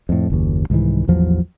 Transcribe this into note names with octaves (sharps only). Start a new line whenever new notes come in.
F2 A2
F#1 D#2
C2 G#2 D#3 E3
A1 E2 F3 F#3